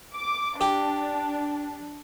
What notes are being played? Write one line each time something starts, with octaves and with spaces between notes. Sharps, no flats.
D6
D4 G4